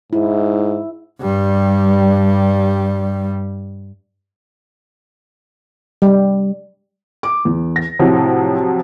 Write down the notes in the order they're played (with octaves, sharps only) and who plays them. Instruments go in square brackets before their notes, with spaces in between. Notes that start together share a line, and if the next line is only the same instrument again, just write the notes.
[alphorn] G#2 [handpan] E4
[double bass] G2 G3
[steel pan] G3
[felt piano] D6
E2
[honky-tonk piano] A#6
[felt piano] A2 [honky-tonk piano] C3 F3 F#3